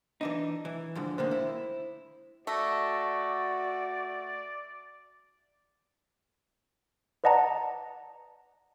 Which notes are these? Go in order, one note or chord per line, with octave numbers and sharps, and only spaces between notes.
E3 D4 D#4
E3
F2 G#2 D3
D3 D#3 A#3 C5
E4
A3 F#4 D5 C#6 E6 A#6
B4 D5 D#5 F#5 A5 A#5